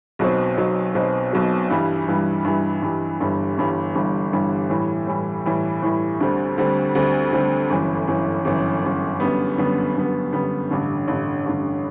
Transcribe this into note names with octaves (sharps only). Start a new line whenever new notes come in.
B1 B2 F#3 C4
B1 B2 F#3 C4
B1 B2 F#3 C4
B1 B2 F#3 C4
G2 E3 G3
G2 E3 G3
G2 E3 G3
G2 E3 G3
G1 G2 E3 G3
G1 G2 E3 G3
G1 G2 E3 G3
G1 G2 E3 G3
A2 E3 G3
A2 E3 G3
A2 E3 G3
A2 E3 G3
D2 D3 G3 C4
D2 D3 G3 C4
D2 D3 G3 C4
D2 D3 G3 C4
G1 F#2 E3
G1 F#2 E3
G1 F#2 E3
G1 F#2 E3
F#2 D3 G3 B3
F#2 D3 G3 B3
F#2 D3 G3 B3
F#2 D3 G3 B3
A1 G2 D3
A1 G2 D3
A1 G2 D3